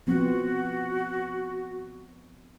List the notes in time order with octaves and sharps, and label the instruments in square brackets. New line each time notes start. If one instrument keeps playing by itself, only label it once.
[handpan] F3 B3 C4 [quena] F#4